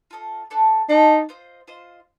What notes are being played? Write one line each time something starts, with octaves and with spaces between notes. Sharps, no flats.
F4 A4 D#5
D4 A4 D5
D4 D#4 A4 D5
F4 C5 D#5
F4 C5 D#5